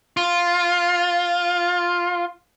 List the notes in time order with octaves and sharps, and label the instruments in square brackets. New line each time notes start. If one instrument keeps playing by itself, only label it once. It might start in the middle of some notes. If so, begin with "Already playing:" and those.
[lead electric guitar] F4